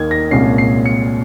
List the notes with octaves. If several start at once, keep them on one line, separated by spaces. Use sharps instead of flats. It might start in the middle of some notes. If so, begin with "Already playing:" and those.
Already playing: D#2 D#3 A#3 D#4 G#6
A#6
C2 A#2 G#3 C#4 C7
C7
C#7